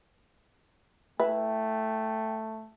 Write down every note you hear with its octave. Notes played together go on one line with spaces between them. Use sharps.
A3 E4 B4 E5 G5